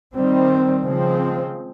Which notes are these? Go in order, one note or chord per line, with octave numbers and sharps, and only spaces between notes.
D#3 G3 C4
C#3 F3 G#3 C4